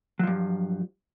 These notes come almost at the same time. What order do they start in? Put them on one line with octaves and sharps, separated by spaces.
F#3 F3 G2